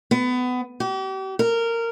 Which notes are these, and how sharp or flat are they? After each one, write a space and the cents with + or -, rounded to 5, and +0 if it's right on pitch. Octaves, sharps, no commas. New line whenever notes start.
B3 +20
G4 -40
A#4 -15